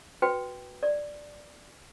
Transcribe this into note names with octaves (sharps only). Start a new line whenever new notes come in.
F#4 B4 G5
D5